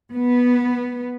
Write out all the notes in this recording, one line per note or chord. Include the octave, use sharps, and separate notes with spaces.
B3